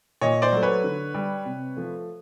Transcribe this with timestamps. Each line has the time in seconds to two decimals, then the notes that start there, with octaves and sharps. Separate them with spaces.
0.21 A#2 C#5 D#5
0.42 C5 D5
0.52 F#3 A3
0.63 B4 C#5
0.84 D3
1.14 G3
1.45 C3
1.77 F3 A3